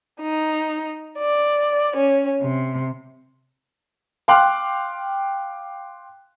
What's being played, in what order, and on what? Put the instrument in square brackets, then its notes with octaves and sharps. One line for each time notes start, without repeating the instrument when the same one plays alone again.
[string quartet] D#4
D5
C#4
C3
[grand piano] F5 G5 C6 D6 F6 F#6